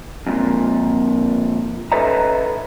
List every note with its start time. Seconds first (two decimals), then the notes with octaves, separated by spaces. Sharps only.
0.26 F2 A#2
1.92 A4 B4 C#5 D#5 E5 A#5